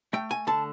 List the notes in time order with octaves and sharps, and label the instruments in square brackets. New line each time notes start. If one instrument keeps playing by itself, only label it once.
[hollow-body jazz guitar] A3 G5
G#5
D3 A5